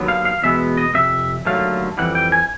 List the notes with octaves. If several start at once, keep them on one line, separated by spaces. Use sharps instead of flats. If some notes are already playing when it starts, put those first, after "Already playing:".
Already playing: D#2 D3 F#3 B3
F5
F5
E2 B2 G#3 B3 E5
D#5
F2 C3 E5
D#2 D3 F#3 A3 F5
F2 C3 E3 G3 F#5
G5
G#5